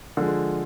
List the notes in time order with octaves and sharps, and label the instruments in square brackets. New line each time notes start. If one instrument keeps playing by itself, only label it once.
[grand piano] D3 F3 G#3